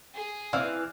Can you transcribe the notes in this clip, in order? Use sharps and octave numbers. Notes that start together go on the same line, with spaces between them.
G#4
E3 C4 D5 F5 E6